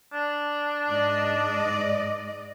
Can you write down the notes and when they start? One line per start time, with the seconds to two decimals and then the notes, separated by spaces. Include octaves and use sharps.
0.13 D4
0.89 G#2 D5 D#5